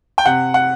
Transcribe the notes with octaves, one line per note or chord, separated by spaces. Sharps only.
G5
C3 F#5
F#5